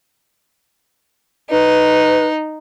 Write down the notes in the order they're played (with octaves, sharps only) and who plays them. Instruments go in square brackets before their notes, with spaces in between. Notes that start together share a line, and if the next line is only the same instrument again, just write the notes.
[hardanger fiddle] D#4 [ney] B4